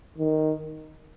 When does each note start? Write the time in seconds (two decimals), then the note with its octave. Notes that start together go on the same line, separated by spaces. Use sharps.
0.18 D#3